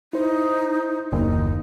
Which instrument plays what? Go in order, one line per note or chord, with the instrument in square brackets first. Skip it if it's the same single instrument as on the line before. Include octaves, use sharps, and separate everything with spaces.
[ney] D#4 [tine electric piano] E4 C5
[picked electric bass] F#1 D#2 [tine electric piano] A#3 [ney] D#4